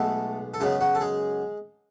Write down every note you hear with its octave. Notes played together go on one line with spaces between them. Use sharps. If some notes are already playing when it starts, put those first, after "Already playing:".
Already playing: B1 B2 G#3 A3 B3 A4
A4
F#2 C#3 F#3 G#3 B3 G#4
F#3 F#4
A4
G#3 G#4